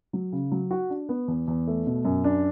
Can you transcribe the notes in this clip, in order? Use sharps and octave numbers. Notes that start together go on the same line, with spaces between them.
F#3
C#3
F#3
F#4
D4
B3
E2
E2
A3
B2
F#2
D4